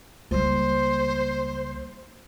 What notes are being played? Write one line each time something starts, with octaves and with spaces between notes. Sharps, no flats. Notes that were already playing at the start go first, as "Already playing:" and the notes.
C#2 G3 A#3 C5